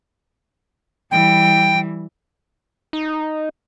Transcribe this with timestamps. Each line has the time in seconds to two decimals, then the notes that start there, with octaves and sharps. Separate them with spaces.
1.11 E3 G3 G5
2.93 D#4